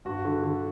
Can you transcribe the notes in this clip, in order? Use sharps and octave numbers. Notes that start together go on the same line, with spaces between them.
G2 F#4
D3
D3